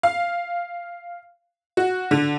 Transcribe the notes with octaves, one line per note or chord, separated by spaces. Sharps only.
F5
F#4
D3